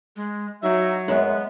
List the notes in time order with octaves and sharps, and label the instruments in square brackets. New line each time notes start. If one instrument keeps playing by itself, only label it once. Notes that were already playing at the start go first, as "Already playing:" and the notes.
[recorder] G#3
[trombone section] F#3 [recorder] D#4 [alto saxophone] E5
[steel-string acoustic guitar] F#2 [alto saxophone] G#3 [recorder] B3